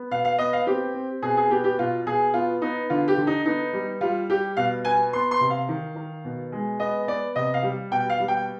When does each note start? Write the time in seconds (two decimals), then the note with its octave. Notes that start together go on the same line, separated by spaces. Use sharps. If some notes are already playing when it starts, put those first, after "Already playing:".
Already playing: B3
0.11 B2 F5
0.25 F5
0.38 B3 D#5
0.53 F5
0.66 C4 G4
0.94 C4
1.22 B2 G#4
1.37 G#4
1.50 B3 G4
1.64 G4
1.79 B2 F4
2.06 B2 G#4
2.34 B3 F4
2.62 B3 D#4
2.90 D3 F4
3.08 G4
3.18 D3
3.27 D#4
3.46 B3 D#4
3.73 G3
4.01 G3 F4
4.29 G3 G4
4.57 B2 F5
4.84 B3 G#5
5.13 B3 C6
5.31 C6
5.41 C3
5.50 F5
5.69 D#3
5.96 D#3
6.25 B2
6.52 G#3
6.80 B3 D#5
7.07 B3 D5
7.36 C3 D#5
7.54 F5
7.63 G3
7.91 B2 G5
8.10 F5
8.20 G3
8.28 G5